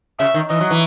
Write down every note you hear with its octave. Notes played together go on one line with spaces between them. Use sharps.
C#3 E5
D#3
E3 D#5
F#3
E3